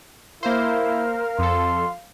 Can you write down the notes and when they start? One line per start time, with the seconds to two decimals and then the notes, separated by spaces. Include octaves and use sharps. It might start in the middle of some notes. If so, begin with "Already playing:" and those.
0.43 A#3 E4 A#4 C5 F5
1.39 F2 A4 C6